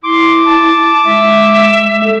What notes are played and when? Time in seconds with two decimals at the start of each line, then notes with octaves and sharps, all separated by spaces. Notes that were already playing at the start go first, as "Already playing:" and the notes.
0.03 E4 C6 D6
0.45 A5
1.05 G#3 E5
2.04 A4